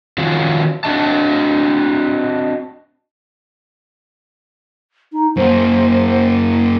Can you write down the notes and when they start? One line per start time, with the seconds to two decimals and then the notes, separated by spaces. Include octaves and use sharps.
0.18 D#3 F3 C#4 F4 F#4
0.84 C4 D4 F#4 D#5 A5
5.13 D#4
5.37 F#2 A#3 C5